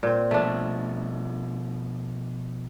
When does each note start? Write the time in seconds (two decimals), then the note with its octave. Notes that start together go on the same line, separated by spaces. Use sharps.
0.03 A#2 C4
0.31 B2 F3 A3 D4